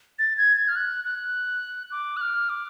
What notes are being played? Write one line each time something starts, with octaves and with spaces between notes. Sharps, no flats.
A6
G#6
G#6
F6
F#6
F#6
D6
F#6
F6
D6